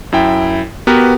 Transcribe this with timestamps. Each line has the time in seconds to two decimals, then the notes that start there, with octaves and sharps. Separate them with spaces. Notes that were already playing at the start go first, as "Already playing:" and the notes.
0.12 F#2 E4 G5
0.87 B3 F#4 G4 A#4 B4